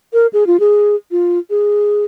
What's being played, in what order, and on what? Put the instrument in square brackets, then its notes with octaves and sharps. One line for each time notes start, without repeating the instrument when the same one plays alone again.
[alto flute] A#4
G#4
F4
G#4
F4
G#4